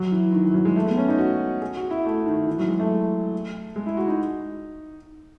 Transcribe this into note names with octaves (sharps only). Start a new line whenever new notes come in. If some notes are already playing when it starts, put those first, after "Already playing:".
Already playing: F#3
E3
D#3
E3
F#3
G#3
A3
B3
C#4
D#4
F#4
G#4
F#4
E4
A3
D#3
E3
F#3
G#3
A3
G#3
E4
F#4
D#4